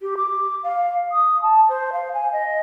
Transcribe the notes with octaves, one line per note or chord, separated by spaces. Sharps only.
G4
D6
F5
D#6
A5
C5
F5
G#5
D#5